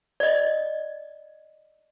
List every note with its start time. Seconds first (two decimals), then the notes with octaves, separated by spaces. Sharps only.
0.20 D5 D#5